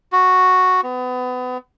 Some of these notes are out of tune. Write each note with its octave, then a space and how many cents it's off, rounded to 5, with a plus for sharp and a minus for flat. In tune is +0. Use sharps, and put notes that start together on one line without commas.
F#4 -5
B3 +30